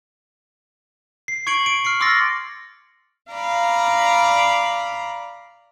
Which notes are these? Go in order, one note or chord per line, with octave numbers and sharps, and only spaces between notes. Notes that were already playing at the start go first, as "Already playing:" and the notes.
C7
C#6 G#6 C#7 D7 F#7
D7
F6 C7 C#7
C6 D6 E6 F6 A6 A#6
D5 F5 A#5 B5